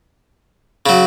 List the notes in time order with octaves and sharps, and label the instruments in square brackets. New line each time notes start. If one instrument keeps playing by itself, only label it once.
[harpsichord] C#3 F#3